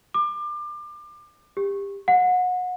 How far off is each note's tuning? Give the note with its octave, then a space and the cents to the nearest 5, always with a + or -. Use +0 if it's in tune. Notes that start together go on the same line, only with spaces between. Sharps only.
D6 +30
G4 +25
F#5 -25